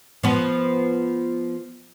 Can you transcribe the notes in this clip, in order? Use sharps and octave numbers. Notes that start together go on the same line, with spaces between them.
F3 B3